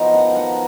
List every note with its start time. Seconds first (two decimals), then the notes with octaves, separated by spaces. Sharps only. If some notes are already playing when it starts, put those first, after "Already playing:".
Already playing: F3 B3 D#4 F#4 A#4
0.13 F#5
0.36 F#5